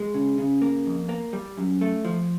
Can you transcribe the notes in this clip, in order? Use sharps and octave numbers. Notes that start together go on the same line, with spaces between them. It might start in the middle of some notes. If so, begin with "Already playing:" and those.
Already playing: G#3
C#3
C#3
A#3
F2
A#3
G3
F#2
A3
F3